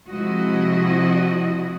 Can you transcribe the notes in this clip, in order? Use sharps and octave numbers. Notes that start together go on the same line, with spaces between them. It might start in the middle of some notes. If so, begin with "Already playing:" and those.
C3 F3 G#3 E4 F#4 D#5